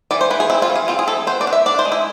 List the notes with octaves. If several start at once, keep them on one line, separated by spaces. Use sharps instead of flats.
E3 D5
C5
E3 B4
G#4
C4 E4
F4
E3
G#4
C4 F4
G#4
E3 A4
B3 C5
D5
D4
E5
D4 D5
C5
G#3
E4